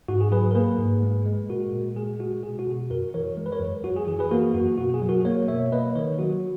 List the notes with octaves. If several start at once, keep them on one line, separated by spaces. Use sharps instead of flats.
G#2 F#4
G#4
F#3 G#4 B4
A#4
A#3 G#4 B4
G#2
G#3
G#3
A#2 F#4 A#4
A#2
G#3 G#4
G#3 F#4
B2 G#4
F#4
B2
F#2 F#4 A#4
E3 A#4 C#5
G#3
B4
A#4 C#5
F#2
F#2 F#4
G#4
E3 G#4
G#4 B4
A#3 F#4 A#4
F#2 F#4
B2 F#4
G#4
F#3
F#4 A#4
A#3 A#4 C#5
B2 C#5 E5
A#3 B4 D#5
D#3 A#4 C#5
F#3 F#4